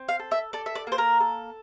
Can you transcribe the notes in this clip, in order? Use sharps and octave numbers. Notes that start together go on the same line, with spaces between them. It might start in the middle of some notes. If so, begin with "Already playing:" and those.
Already playing: C4
F5
A4
E5
A4 D5
E5
D5
A#3 C5
A#4
A4